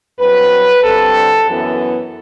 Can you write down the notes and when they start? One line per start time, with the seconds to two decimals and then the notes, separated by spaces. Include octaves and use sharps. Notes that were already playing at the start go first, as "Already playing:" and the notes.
0.19 G2 F#3 C4 B4
0.83 G2 D3 G3 C4 A4
1.46 F#2 E3 B3